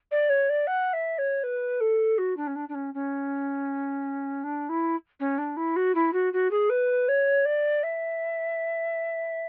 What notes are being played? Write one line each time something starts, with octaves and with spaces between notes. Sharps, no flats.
D5
C#5
D5
F#5
E5
C#5
B4
A4
F#4
D4
C#4
D4
D4
C#4
C#4
D4
E4
C#4
D4
E4
F#4
E4
F#4
F#4
G#4
B4
C#5
D5
E5